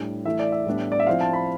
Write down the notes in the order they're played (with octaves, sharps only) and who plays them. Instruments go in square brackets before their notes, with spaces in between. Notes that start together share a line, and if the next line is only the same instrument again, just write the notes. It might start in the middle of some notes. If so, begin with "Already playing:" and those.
Already playing: [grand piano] A2 G3 D4
E3 A3 E4 E5
D5
E5
A2 G3 B3 D4
D5
E5
F3 C4 E4 F5
A5
B5